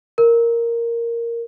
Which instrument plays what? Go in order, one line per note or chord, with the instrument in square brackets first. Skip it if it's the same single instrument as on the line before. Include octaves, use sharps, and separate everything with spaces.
[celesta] A#4